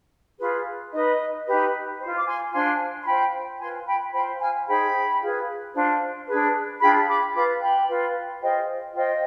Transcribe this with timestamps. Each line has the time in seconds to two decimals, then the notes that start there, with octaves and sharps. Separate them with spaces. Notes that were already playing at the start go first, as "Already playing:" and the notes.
0.38 F4 G#4 B4
0.91 D#4 B4 D#5
1.45 D#4 G4 B4
1.99 F4 C5
2.17 D6
2.25 G#5 C6
2.52 D4 F4 C5 G#5 C6
3.02 C6
3.06 F4 C5 G5 B5
3.59 F4 B4 G#5 C6
3.86 G5 B5
4.12 F4 C5 G5 B5
4.39 F5 G#5
4.66 D#4 G#4 C5 G5 B5
5.21 F4 G#4 B4
5.74 D4 F4 C5
6.27 D4 G#4 B4
6.80 D4 F4 G#4 G5 B5
7.08 B5 D6
7.34 F4 B4 B5 D6
7.60 G5 B5
7.88 F4 B4
8.41 F4 G#4 C5 D#5 G5
8.94 F4 C5 D#5 G5